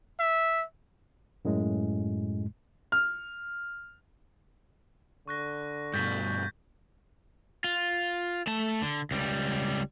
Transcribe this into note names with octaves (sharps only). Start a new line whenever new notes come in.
E5
F#2 A2 G#3
F6
D3 C#6 F#6 A#6
G2 B2 G6 A6 B6
F4
A3 A5
D3
C#2 G3